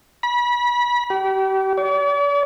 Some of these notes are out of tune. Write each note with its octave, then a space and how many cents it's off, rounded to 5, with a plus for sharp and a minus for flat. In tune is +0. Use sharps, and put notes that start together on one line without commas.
B5 -30
G4 -35
D5 -45